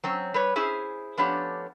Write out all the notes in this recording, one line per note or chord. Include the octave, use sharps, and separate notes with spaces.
F#3 C4 C#4
G3 B4 C#5
C#4 E4 G#4 C5
F3 A3 B3 C#4 D4 G4